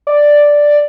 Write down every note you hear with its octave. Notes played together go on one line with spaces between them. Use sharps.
D5